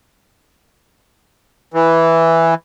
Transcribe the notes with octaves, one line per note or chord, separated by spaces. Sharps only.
E3